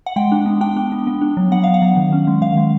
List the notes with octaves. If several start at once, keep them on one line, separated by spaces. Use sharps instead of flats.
F#5
G#3 G5
D4
B3
D4 G5
D4
B3
B3
D4
F#3
B3 F#5
F#3 F5
F#5
F#3
D#3
C#4
G#3
D#3 F5
G#3